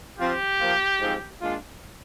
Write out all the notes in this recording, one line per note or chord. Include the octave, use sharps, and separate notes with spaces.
F3 C4 F4 G4
F3 A#3 F4
G#2 F3 C4
A#2 G#3 D4 F4